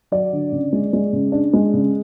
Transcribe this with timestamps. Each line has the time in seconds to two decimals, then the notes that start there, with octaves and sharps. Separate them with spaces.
0.12 F#3 D5
0.33 D3
0.52 C#3
0.73 G#3
0.93 G#3
1.13 C#3
1.32 D4
1.53 G#3
1.74 C#3